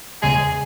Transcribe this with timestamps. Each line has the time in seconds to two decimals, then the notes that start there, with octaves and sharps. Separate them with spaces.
0.22 E2 C#3 G#3 G#4